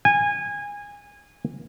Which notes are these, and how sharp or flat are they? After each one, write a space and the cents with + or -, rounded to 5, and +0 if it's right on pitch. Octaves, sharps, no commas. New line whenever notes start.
G#5 -20